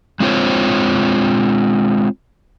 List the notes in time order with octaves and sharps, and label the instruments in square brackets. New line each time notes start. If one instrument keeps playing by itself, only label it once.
[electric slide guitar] G#3 C4 F4 C5 C#5